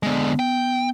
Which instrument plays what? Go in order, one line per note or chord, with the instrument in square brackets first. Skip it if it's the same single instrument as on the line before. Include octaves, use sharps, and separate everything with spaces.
[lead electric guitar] D3 G#3 [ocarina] B3
[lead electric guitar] G5